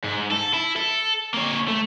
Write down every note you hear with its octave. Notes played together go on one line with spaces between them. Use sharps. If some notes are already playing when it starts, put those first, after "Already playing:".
G#2
A4
E4
A4
A#3 C#5
A3